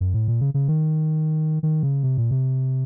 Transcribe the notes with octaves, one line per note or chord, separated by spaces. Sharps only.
F#2
A2
A#2
C#3
C#3
D#3
D#3
C#3
C3
A#2
C3